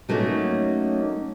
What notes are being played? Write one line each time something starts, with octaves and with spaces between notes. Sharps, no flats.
F#3 A3 A#3 C#4 D#4